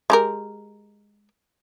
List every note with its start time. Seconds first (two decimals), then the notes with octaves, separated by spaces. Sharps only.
0.10 G#3 G4 A#4